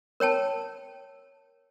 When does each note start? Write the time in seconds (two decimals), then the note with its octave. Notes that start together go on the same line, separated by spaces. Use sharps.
0.20 A#4 C#5 G5 A5